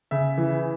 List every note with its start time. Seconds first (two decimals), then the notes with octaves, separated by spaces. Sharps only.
0.11 C#3 E5
0.38 E3